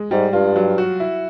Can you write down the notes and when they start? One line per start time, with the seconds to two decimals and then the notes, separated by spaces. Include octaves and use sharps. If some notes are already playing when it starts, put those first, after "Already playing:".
Already playing: G#3
0.11 G#2 G3
0.33 G2 F4
0.56 F#3
0.78 F#4
1.00 E4